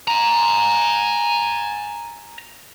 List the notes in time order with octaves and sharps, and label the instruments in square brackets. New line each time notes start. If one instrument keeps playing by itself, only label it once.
[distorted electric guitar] G#5 A#5